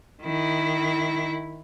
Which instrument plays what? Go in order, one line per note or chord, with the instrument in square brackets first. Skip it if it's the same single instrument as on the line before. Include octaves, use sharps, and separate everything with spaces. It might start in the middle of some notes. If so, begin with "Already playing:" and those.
[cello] D#3 E4